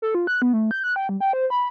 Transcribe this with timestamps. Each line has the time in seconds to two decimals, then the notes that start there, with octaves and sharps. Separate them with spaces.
0.02 A4
0.15 F4
0.27 F#6
0.42 B3
0.53 A3
0.71 G6
0.84 F#6
0.96 G5
1.09 G3
1.21 G5
1.33 C5
1.50 B5